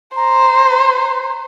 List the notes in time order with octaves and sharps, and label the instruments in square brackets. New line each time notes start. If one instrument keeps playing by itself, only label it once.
[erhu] C5 [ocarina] A#5